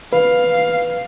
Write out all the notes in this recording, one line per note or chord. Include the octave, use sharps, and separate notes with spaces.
B4 F5